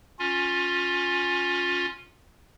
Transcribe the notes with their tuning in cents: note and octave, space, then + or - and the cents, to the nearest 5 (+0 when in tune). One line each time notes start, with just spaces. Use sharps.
C#4 +0 F4 +20